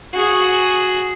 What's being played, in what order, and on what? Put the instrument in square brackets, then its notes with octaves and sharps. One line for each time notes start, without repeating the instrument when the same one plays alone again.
[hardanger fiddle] F#4 G#4